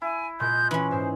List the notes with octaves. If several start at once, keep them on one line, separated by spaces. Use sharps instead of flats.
E4 G#5
A#2 G#3 D#5 G6
E3 C#4 B5
G#2 E4 C5